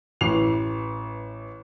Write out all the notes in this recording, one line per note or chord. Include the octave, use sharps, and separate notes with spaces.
A1 E3 C7 F7